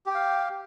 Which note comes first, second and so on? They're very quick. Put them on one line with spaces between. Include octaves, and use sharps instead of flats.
G4 G5 F5